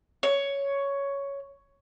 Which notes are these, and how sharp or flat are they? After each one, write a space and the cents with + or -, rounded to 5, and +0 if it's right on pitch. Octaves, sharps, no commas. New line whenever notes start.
C#5 +5